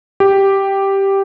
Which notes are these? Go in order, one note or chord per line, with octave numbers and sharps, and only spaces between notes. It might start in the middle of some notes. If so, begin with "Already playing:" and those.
G4